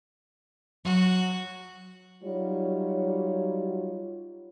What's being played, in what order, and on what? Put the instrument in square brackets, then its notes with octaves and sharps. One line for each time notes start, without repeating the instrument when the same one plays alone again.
[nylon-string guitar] F#3 [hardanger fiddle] F#4
[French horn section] F#3 G3 D#4 F4 F#4 C#5